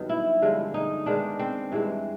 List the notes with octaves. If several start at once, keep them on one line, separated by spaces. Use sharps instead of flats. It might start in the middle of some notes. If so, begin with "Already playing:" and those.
Already playing: G2 D#3 F#3 B3
E4
G2 D3 F3 G#3
D#4
D#3 G#3 B3 D4
C4
G2 E3 G#3 C4